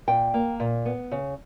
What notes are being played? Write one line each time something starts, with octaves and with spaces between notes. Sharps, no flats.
A#2 G5
A#3
A#2
B3
C#3